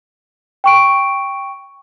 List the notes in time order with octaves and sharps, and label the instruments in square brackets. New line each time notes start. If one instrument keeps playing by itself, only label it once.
[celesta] G5 C#6 D7